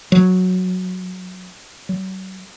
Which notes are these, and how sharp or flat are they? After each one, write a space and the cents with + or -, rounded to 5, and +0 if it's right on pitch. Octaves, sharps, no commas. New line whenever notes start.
F#3 -10
F#3 +40